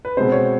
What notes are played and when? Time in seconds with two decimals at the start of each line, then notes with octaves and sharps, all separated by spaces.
0.05 B4
0.17 B2 G#3 C4 C5
0.32 C#5